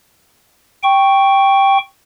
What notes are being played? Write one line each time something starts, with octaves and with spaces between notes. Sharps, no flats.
G5 C#6